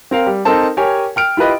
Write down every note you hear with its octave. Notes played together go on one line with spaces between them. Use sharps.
C4 A#4 F5
G3
C4 D#4 A4 A#4 C5 A5
G4 A#4 C#5 G#5
G5 F6 D7
E4 F4 G4 B4 D#5